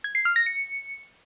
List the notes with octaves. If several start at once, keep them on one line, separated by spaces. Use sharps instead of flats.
G#6
C7
F6
A#6
C#7